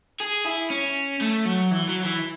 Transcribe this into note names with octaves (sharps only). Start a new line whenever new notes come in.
G#4
E4
C#4
A3
F#3
E3
F#3
E3